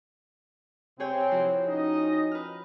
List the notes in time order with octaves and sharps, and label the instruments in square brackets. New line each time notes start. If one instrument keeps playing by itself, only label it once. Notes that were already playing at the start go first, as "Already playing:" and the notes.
[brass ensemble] C3 C4 [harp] G#4 C#5 G5
[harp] F3 E4 F#4
[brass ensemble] C#4 D#4 D#5
[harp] B4 F6